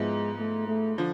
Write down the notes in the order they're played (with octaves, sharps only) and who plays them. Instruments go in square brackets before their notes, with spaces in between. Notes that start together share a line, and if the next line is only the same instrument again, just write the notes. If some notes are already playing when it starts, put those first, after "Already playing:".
Already playing: [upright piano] G#2 F3 B3 E4 [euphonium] G#3
[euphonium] A3
A3
[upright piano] D3 F3